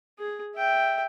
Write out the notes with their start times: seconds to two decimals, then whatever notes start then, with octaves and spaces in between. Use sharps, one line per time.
0.19 G#4
0.55 E5 G5